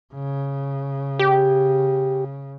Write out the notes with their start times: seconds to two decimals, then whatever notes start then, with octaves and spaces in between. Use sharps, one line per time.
0.14 C#3
1.19 G4